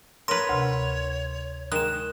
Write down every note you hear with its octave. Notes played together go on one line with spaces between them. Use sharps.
A#4 B4 C#5 C6
D2 C3
D#3 G#3 F#6 E7